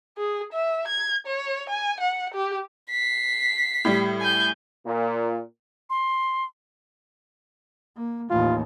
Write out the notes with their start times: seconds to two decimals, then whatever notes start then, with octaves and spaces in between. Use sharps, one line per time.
0.17 G#4
0.53 E5
0.88 G#6
1.26 C#5
1.69 G#5
2.00 F#5
2.34 G4
2.90 B6 C7
3.85 A2 G3
4.20 G#5 G6
4.85 A#2
5.90 C6
7.96 A#3
8.30 A1 D#2 F4